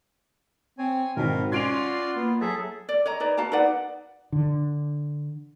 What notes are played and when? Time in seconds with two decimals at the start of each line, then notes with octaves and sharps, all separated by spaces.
0.78 C4 C#5 G#5
1.16 G#1 B2 C4 A#4
1.52 C#4 F4 F#4 D5 C6 G#6 D7 F7
2.16 A#3 B3
2.41 F#3 G#4 A4 E5 A6
2.89 D5
3.06 C#5 D#5 A#5
3.20 D#4 B4 D5 A#5
3.37 F#4 F5 A5 A#5
3.52 D#4 B4 D5 F#5
4.32 D3